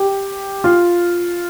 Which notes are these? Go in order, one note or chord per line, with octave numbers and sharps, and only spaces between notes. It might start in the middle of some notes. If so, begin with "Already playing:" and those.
Already playing: G4
F4